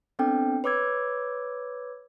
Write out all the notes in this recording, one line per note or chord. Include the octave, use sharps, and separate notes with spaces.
B3 C4 D4 A4 G5
B4 C#5 D6 E6 G#6